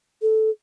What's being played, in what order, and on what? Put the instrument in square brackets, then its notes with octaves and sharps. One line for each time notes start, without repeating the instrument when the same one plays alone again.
[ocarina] A4